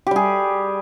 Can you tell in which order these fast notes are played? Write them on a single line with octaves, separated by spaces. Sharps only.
G4 G3 G#4